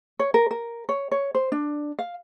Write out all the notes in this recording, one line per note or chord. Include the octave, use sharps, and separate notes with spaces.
C#5
A#4
A#4
C#5
C#5
C5
D4
F5